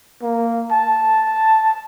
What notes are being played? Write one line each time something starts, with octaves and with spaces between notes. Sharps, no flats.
A#3
A5